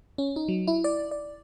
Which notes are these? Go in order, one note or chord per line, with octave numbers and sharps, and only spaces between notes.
C#4
D#4
F#3
E4
D5
D5